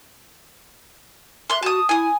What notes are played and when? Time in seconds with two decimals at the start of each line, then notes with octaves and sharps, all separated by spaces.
1.50 E5 C6 F#6
1.63 F#4 A5 D#6
1.89 E4 G#5 D#6